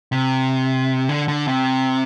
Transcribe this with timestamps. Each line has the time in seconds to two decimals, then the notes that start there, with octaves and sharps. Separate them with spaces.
0.12 C3
1.09 D3
1.28 D3
1.48 C3